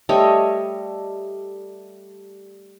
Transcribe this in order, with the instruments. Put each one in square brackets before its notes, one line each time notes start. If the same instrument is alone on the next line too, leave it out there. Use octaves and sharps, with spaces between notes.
[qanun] G3 A3 C#5 D#5